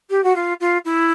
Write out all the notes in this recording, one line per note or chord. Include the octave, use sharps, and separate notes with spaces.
G4
F#4
F4
F4
E4